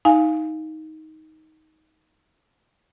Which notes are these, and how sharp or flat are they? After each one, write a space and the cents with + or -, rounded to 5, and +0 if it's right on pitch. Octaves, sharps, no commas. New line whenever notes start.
D#4 +15 F5 +0 G#5 +0